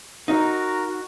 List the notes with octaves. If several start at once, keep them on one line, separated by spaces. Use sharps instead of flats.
D#4 F#4 A#4 A#5
F#4